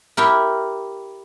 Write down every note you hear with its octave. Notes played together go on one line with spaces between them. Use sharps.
E4 G4 A#4